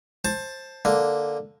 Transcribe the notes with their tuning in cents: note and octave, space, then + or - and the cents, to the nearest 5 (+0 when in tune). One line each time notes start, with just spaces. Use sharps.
C5 +15 A5 +0
D3 +0 A#3 +0